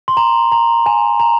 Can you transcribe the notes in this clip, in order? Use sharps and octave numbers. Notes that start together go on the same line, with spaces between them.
C6
A#5
A#5
G#5
A#5